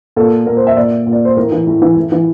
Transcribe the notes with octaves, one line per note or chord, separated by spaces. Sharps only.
A#2 A4
A#2 A#4
C5
E5
A#2 D5
A#2
D5
C5
A2 A#4
E3
A2
E3
A2
E3